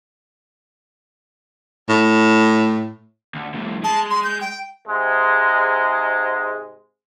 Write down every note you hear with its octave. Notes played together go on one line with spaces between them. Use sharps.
A2
D2
F2 A2
G#3 A5
C6
G6
G5
G#2 C3 G#3